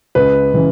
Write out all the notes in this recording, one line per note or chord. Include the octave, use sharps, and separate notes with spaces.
C#2 B4
C#3 E3